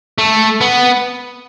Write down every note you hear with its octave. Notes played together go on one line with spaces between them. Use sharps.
A3
B3